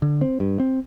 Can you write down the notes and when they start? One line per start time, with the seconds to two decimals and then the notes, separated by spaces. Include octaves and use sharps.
0.02 D3
0.21 C4
0.40 G2
0.60 C4